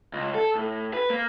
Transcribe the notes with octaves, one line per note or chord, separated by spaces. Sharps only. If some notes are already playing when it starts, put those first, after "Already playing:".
C#2
A4
A2
B4
A#3